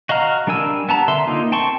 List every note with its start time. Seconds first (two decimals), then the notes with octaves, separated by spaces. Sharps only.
0.09 F#4 D#5 F5 A#5 F6
0.47 G3 D4 A#4 G#5 E6
0.89 B3 A5 A#5
1.08 D3 E5 C6
1.27 A#3 D#4 F4
1.52 C4 G5 A5 C6 C#6